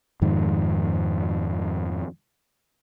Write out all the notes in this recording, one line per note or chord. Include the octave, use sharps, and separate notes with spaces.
F2 G#2 D#3